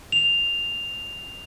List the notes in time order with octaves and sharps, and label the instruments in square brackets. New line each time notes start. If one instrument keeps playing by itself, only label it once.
[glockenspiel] F7